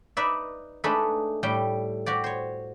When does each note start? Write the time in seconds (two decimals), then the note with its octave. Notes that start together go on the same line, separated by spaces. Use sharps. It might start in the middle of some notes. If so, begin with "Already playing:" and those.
0.17 D#4 B4 D5 E5
0.84 G#3 A3 D4 D#4 A4 B4
1.43 A2 G3 G5
2.06 F#4 G4 D5
2.24 C5 C#5